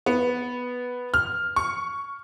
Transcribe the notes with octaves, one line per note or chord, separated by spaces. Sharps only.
B3
F6
C#6